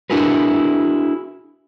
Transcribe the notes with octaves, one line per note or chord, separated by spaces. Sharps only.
D4 E4 F#4 G#4 A#4 B4